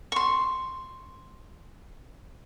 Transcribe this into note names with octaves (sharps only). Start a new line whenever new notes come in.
C6 C#6